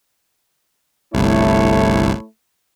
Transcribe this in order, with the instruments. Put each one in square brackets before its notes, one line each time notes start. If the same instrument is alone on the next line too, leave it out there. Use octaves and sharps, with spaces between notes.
[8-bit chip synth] G1 C2 [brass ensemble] A3 E4 C#5